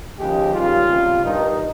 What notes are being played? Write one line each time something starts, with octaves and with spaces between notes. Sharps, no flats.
D#2 C#3 F3 G#3 G4
D#2 C#3 G3 F4
C#2 C3 G3
G2 D#3 G3 D#4